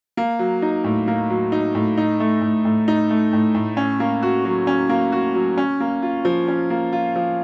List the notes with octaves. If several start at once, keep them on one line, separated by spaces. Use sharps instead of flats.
A#3
F#3
D#4
A2
A#3
F#3
D#4
A2
D#4
A3
A2
A2
D#4
A3
A2
A2
C#4
A#3
F#4
F#3
C#4
A#3
F#4
F#3
C#4
A#3
F4
F3
C#4
A#3
F4
F3